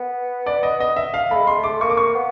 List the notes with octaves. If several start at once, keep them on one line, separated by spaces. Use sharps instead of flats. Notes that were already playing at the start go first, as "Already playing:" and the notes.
Already playing: B3
D5
D#5
D#5
E5
F5
A3 B5
G#3
C6
A3
D6
A#3 C#6
D6
C#6
B3